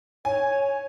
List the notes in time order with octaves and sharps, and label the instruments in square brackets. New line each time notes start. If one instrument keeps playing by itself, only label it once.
[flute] C#5 [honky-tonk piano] G#5